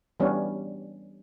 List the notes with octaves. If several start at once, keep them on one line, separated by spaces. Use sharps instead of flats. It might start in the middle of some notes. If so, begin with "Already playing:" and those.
E3 G3 B3 C#4 D4